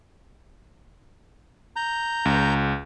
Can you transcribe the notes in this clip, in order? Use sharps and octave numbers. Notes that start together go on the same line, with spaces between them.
A#5 G6
C#2